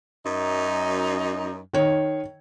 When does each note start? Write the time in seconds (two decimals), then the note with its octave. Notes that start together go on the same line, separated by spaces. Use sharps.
0.25 F#2 D#4
1.73 D#3 C#5